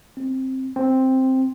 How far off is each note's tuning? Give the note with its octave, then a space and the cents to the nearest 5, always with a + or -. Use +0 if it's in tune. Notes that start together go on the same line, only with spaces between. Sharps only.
C4 +10
C4 +5